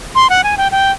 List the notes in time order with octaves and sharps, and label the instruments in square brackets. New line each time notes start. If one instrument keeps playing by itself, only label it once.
[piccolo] C6
F#5
G#5
G5
G5